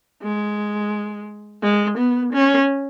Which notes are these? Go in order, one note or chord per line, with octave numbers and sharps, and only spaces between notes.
G#3
G#3
B3
C#4